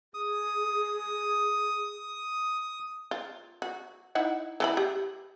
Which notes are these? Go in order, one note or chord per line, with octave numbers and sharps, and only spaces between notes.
G#4 D#6
F4
F#4
D#4 E4 F#5
E3 A4 B5
G4